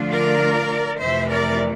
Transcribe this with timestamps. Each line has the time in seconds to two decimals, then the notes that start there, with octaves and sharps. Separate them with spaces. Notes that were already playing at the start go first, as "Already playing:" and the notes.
Already playing: D3 F3 A3 D4 F4
0.10 A#4 D5
0.99 F2 C3 E3 A3 C5 E5
1.29 A#4 D5